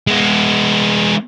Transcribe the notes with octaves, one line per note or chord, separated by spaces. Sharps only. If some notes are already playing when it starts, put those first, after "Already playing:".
G#3 B3